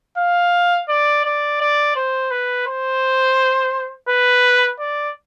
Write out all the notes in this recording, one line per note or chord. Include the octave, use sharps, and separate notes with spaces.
F5
D5
D5
D5
C5
B4
C5
B4
D5